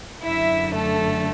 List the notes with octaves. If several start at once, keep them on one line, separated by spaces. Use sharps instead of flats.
F#2 D3 E4 E5
A3 A4